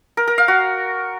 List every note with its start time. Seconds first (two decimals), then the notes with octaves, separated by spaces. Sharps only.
0.17 A#4
0.28 A#4
0.38 F5
0.48 F#4